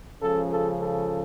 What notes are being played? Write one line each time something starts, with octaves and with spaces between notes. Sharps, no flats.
C#2 C#3 F3 A4
A4
A4